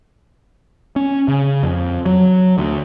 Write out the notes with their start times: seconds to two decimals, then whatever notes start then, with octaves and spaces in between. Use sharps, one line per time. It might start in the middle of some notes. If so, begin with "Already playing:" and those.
0.96 C#4
1.28 C#3
1.63 F2
2.06 F#3
2.58 D2